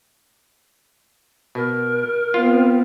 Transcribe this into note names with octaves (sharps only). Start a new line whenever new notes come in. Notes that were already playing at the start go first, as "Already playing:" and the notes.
B2 A#4
B3 C4 F4